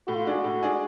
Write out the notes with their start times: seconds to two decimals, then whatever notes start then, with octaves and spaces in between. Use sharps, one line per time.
0.07 A2 F#4
0.15 F4
0.24 G#3 D4 F#4 G#4
0.44 A2
0.63 G#3 D4 G#4